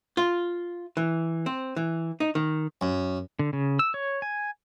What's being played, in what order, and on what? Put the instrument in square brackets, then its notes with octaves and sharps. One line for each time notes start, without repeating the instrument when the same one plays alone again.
[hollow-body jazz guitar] F4
E3
C4
E3
D#4
D#3
[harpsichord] F#2
[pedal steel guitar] D3
C#3
E6
C#5
G#5